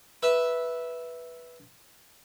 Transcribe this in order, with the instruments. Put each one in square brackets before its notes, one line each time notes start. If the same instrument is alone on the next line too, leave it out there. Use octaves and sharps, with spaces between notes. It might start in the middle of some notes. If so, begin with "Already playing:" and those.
[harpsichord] B4 E5